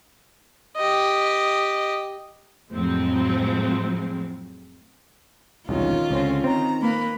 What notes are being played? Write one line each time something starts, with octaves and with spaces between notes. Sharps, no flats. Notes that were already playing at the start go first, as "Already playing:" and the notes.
G4 D#5
F2 A2 F3 F#3 G#3 C4
E1 C2 D#3 C#4 F4
C#2 D3 C4 C#4
D#3 C4 A#5
A#3 B4 B5